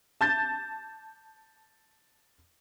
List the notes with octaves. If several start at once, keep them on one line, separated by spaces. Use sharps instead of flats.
A5 G6 A6